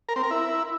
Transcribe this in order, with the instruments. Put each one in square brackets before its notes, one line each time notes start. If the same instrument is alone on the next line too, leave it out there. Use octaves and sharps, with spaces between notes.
[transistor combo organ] A#4
C4
A#4
E4